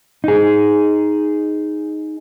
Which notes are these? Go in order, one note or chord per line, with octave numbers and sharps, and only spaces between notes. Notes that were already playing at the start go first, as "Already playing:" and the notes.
D#4 G#4